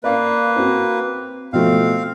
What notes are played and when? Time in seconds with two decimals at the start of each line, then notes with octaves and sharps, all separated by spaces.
0.04 A#3 B4 D5 F5
0.56 C4 F#4
1.53 B2 F3 A3 C4 F5